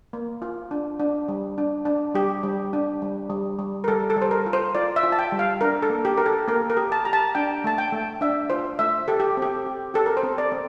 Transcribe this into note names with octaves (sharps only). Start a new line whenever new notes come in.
A#3
F4
D4
D4
G3
D4
D4
G3 G4
G3
D4
G3
G3
G3
A#4
G3 A4
A4
G3
C5
A#4
F4
C5
F4 D5
E5
F4
A5
G5
G3
F5
D4 A#4
A4
A#3
G4
G4 A#4
A4
A#3 A#4
A#4
G4
A5
G4 A#5
A5
D4 G5
A3 A5
G5
A3
D4 E5
F4 C5
A3 E5
G4 A4
G4
C4
G4
G4
G4 A4
A#4
C5
C4
D5
C4